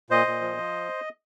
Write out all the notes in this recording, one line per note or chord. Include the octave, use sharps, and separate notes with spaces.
A#2 C5 D#5
A#2
F3
F3